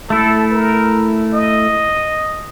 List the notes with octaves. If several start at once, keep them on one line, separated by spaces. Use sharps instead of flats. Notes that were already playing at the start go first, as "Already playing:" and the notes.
A3 E4 A4
A#4
D#5